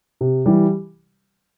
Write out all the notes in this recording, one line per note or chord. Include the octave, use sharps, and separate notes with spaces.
C3
E3 G3